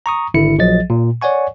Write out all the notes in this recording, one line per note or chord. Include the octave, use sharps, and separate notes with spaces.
A#5 C#6 D#6
G#1 D3 E4 C#7
A#1 F3 F#3 D#5 A6
A#2
C#5 D5 F#5 G#5 C#6